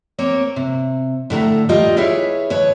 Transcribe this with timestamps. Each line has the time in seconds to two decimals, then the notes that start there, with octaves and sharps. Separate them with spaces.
0.19 A#3 C4 C#5
0.56 C3
1.30 A2 D3 A3 A#5
1.69 D#2 G3 F4 D#5
1.97 E4 G#4 B4 C#5 E5 F5
2.50 D#2 B4 C#5